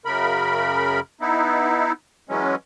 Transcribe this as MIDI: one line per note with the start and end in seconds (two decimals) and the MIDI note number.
0.05 1.00 42
0.05 1.00 49
0.05 1.00 70
0.05 1.00 83
1.21 1.92 59
1.21 1.92 63
1.21 1.92 64
2.29 2.55 52
2.29 2.55 54
2.29 2.55 56
2.29 2.55 61